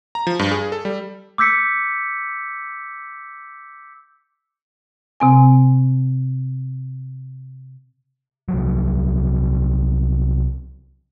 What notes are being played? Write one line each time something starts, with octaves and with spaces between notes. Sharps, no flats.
A#5
F3
G2
G#4
A4
G3
D6 E6 G6 B6 C#7
C3 C4 G#5
C2 F3 F#3